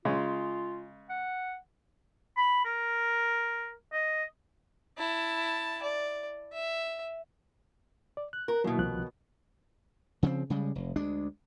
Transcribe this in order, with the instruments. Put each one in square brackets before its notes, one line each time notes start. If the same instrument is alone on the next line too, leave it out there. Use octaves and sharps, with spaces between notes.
[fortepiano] C#3 G#3 [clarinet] F4
[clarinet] F#5
[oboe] B5
A#4
D#5
[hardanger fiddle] E4 A5
D5
E5
[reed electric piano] D5
F#6
[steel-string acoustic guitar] A#4
[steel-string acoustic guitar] D#2 B2 [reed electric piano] F#3 A#3 E4
[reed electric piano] C2 F3 F#6
[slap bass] C#3 F3 A#3 C4
C#3 G3 G#3
F1
D2 G#3 D4